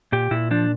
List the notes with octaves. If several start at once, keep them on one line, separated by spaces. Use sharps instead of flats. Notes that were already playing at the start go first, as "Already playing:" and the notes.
A#2 G4
A#2 E4
F3 D4